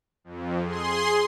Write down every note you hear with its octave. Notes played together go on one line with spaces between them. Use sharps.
F2
G#4 C6